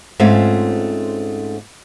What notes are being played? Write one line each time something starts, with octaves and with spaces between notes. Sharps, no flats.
G#2 A3 C4 C#4 F4